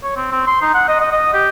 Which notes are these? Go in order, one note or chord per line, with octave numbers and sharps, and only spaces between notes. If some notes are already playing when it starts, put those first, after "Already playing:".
C#5
C4
C4
C6
D#4
F#5
D#5
D#5
D#5
G4